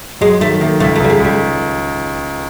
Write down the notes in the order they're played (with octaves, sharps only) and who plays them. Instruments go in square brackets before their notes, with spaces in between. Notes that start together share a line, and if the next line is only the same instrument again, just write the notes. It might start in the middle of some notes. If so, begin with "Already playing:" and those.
[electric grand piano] F#3 [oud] G#3
[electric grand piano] D#3 [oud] A3
[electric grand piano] D#3 [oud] A#3
[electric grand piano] C#2 [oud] A3
[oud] A3
[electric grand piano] C#2 [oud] G3
[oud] G#3
[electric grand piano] C#2 [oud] G3